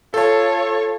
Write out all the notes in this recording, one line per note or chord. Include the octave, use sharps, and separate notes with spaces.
F4 A4 C#5 A5